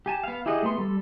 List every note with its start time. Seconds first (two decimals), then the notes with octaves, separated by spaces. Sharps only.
0.06 G4 G#5 A5
0.24 B3 F5
0.46 E4 G4 G#4 D#5 F#5
0.63 A3 B3 C6
0.78 G3 A4